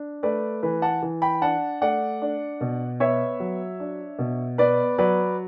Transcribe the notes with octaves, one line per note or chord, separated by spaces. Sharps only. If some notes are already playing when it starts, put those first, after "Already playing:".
Already playing: D4
A3 B4 D5
E3 B4
F#5 A5
E3
G5 B5
D4 F#5 A5
A3 D5 F#5
D4
B2
B3 C#5 E5
F#3
D4
B2
B3 B4 D5
F#3 B4 D5